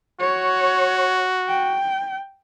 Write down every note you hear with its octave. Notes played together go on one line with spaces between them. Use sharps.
F#4 C#5
G5